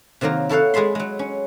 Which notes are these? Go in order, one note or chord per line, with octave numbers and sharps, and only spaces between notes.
C3 D#3 F#3 A#3 A#4
E4 A4 C#5 F5 F#5
G#3 G#4 A5 B5 C6
F#3 G#3
C#4